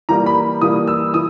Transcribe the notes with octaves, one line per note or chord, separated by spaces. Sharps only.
E3 G3 A#3 A#5
B5
E3 G3 A#3 D#6
E6
E3 D#6